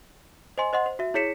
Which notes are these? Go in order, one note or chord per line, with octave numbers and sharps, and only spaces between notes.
C5 D#5 G#5 C6
C5 D#5 F#5 C6
C5
F#4 E5
E4 G#4 C#5 B6 C#7 E7